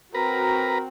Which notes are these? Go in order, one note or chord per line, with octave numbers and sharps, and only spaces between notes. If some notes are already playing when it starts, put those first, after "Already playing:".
C4 F#4 A#4 B4 A#5